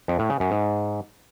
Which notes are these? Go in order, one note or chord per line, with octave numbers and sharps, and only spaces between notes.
F2
A2
C#3
F#2
G#2